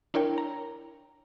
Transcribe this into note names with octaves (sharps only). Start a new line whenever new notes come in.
D4 E4 A#4 C#5 G5
A#5